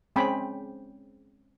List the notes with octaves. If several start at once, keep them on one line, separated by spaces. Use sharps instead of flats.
G#3 C4 C#4 G5 G#5 B5